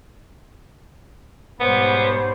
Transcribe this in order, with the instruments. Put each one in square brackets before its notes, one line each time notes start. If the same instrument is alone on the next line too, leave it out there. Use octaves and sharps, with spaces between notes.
[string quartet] G#2 B2 G3 [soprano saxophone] B3 [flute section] C5 C#5 B5